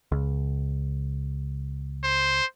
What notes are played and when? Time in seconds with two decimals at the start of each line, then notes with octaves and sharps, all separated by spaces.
0.12 C#2
2.04 C5